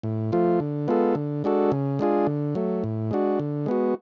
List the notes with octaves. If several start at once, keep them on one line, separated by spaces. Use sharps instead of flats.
A2
F3 A3 F4
D3
G#3 B3 F4 A4
D3
G#3 D4 F#4 A4
C#3
G#3 D4 F4 G#4
D3
F#3 A3
A2
G#3 D4 F#4
D3
G#3 B3 F#4